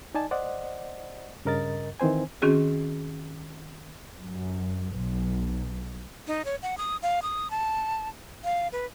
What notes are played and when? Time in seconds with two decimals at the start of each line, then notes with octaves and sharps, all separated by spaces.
0.15 D#4 D5 G#5 A5
0.31 C5 D5 D#5 F#5
1.45 G2 C#3 A#4 D#5 A6
2.00 D#3 E3 C4 C5 G#5
2.42 D#3 C4 C#4 F#4 G#4
4.21 F#2
4.93 B1
6.27 D#4
6.45 C#5
6.63 F#5
6.78 D#6
7.03 F5
7.22 D#6
7.50 A5
8.44 F5
8.72 B4